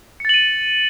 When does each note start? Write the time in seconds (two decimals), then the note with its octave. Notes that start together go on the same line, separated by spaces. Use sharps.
0.20 C#7
0.25 A6
0.29 F#7
0.34 D#7